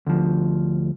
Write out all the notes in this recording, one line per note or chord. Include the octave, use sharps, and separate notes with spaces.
D2 F3